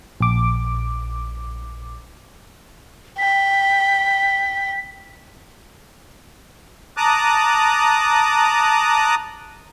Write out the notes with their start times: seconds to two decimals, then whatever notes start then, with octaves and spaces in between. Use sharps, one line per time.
0.21 A#1 D6
3.18 G5 B6
6.97 A5 A#5 D6 D#6 F#6